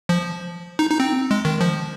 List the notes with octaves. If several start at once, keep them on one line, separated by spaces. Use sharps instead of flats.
F3
D#4
D#4
C4
G#3
D#3
F3